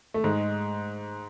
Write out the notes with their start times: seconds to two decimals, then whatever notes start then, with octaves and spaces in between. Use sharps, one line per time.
0.14 A3
0.24 G#2 G#3